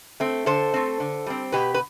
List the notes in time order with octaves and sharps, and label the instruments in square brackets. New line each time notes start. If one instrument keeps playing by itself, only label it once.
[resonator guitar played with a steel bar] A3 C4
D3 A4 C5
A3 C4
D3
G3 C4
B2 G4 B4
B4